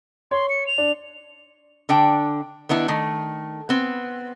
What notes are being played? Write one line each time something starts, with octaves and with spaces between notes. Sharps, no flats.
C#5 C6
C#7
F7
D4
D3 D4 G5
D#3 B3 D4 E4
D#3 A3
B3 C4